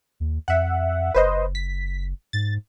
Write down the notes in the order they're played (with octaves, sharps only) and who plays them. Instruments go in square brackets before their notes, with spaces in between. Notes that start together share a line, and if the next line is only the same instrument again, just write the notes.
[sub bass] D#2
[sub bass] F2 [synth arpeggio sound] E5 F#5
[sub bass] F#1 [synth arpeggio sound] B4 C5 D#5
[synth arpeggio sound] B6
[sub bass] G#2 [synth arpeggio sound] A6